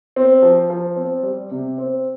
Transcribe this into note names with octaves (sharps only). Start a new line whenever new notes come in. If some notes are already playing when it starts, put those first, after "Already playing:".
C4
F3
F3
C4
G3
C3
C4